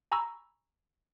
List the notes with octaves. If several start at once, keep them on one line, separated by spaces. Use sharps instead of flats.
G#5 A#5 B5 C#6 E6